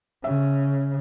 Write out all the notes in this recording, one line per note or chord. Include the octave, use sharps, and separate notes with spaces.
C#3 E5